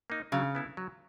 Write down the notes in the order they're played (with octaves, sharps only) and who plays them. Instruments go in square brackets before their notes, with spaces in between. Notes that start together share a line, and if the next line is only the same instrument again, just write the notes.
[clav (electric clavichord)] A#3 D#4
[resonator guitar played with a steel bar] C#3 [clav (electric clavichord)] F#3
[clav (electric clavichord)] B3 E4 A4
F#3